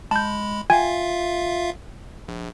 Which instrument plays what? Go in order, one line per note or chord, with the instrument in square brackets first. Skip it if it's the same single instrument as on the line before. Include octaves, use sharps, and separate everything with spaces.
[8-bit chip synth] G#3 B5 [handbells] A5 G6
[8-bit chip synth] F4 E5 F5 [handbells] G5 G#5 G#6
[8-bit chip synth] A#1